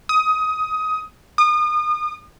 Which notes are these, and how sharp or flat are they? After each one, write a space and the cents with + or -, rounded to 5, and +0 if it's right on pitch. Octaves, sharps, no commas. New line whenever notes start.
D#6 +20
D#6 -35